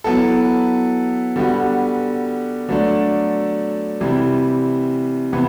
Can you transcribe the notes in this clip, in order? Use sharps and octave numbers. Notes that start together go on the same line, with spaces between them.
F#3 B3 E4 A4
D3 G3 B3 F#4
D3 F#3 A3 D4
C3 E3 G3
C3 E3 B3